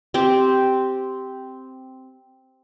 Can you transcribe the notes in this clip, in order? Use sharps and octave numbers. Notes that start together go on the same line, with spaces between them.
C4 G4